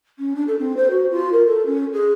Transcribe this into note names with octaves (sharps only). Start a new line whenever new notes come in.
C#4
D4
A4
C4
C5
F#4
F4
A#4
A4
C#4
G#4